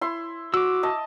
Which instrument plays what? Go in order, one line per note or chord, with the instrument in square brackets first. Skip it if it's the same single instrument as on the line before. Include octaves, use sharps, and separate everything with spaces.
[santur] E4 C6
[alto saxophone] F#4 [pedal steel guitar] D6 E6
[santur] D#5 A5